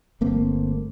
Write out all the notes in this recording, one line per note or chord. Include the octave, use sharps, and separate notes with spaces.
G1 A3 A#3 C4